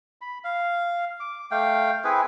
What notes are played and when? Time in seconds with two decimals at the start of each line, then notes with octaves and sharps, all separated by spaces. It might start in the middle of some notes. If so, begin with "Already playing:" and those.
0.21 B5
0.44 F5
1.20 D6
1.51 A3 F5 G5
2.04 C4 E4 G#4 B4